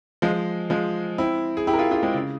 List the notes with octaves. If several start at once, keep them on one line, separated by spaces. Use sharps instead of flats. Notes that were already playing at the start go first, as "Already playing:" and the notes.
F3 G#3
F3 G#3
C4 E4
G#4
E4 G4
A#4
F4 G#4
F4 G#4
G#3 C4
C#3